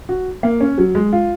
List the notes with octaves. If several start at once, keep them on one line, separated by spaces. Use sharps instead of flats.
F#4
A#3
C#4
F#3
G#3
F4